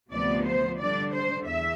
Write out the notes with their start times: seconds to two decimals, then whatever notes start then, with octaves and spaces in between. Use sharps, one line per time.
0.12 D2 C3 F3 B3 D5
0.46 C5
0.79 D3 G3 D4 D5
1.12 C5
1.45 E2 E5